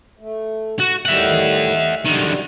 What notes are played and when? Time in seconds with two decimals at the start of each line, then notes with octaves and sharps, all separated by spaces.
0.19 A3
0.80 F#4
1.06 A2 D#3 G3 E5 F#5
2.06 F#2 D3 D#3 G3